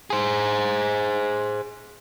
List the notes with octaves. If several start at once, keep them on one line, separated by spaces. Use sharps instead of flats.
G#4 C5